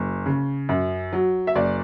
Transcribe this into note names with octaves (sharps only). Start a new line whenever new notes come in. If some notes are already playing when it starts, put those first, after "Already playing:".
Already playing: F#1
C#3
F#2
F#3
E5
F#1 D5